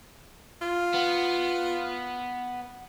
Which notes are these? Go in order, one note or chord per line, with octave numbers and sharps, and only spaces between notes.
F4
B3